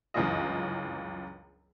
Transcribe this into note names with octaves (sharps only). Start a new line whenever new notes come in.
G1 C#2 F#2 E3 F4 D#5